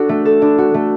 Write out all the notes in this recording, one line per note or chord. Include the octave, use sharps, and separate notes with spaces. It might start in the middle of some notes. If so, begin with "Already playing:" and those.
Already playing: D4 F#4 A4
A3
A4
D4
F#4
A3